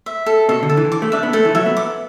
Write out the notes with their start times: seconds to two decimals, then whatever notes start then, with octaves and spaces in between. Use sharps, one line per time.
0.06 E5
0.26 A4
0.49 B2 A4
0.63 D3
0.69 A4
0.77 E3
0.92 D6
1.02 A3
1.12 D4 E5
1.23 B3
1.33 A3 A4
1.45 E3
1.55 F#3 E5
1.66 B3
1.77 D6